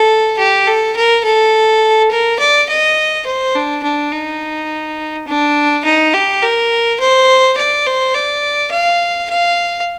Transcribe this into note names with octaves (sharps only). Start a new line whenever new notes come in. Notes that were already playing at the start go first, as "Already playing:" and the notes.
Already playing: A4
G4
A4
A#4
A4
A#4
D5
D#5
C5
D4
D4
D#4
D4
D#4
G4
A#4
C5
D5
C5
D5
F5
F5